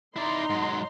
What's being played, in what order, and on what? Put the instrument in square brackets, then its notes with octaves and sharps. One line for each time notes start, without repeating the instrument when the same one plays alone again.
[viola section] D#4 A#5 C6 [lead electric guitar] E4 D5
[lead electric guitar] G#2 F#3